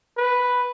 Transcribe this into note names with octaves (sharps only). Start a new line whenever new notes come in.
B4